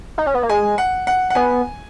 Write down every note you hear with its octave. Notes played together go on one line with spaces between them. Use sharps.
D#4
C#4
B3
A#3
G#3 G#5
F#5
F#5
F#5
B3 G#5